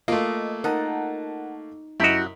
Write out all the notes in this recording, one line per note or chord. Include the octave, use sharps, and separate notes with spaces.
A3 A#3 F4 D#5
D#4 A#4 F#5 A5
F#2 E4 F#4 G4 D#5